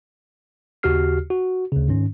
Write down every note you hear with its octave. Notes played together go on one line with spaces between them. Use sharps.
D#2 C#3 F#4 G4 F6 C7
F#4
D2 C#3
G#2 D#3 C#4